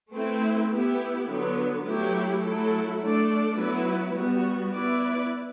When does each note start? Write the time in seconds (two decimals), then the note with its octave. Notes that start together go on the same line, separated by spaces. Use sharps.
0.14 A3 C4 E4 B4
0.72 B3 E4 G4
1.29 D3 F#3 B3
1.87 F#3 A3 E4 G4
2.44 F#3 A3 E4 A4
3.02 A3 D4 A4 D5
3.59 F#3 B3 E4 B4
4.16 G3 B3 F#4
4.74 B3 E4 B4 D5